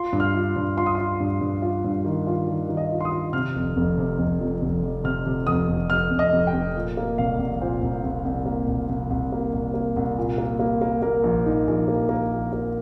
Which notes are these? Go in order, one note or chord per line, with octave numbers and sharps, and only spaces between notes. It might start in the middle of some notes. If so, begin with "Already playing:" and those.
Already playing: F4 C6
G2
F6
F4
G2
F4 C6
D#6
F4 C6
G2
G2
F4
G2
D#3
F4
D#3
D#3
D#5
F4
C6
D#6
F4
C3 F6
F1
F1
C3
F1
F2
F1
F1
C3 F6
C3
F1 D#6
F1
F1 F6
F1
D#5
F1
G5
F1
A#2
A#3
C2 F5
C2
A#2 C5
C2
C2
C2
A#3
C2
C2
C2
A#3
C2
A#3
C2
A#2
A#3
A#3
A#3
A#3 A#4
A#1
D#4
A#1
A#3
A#3
A#1
A#3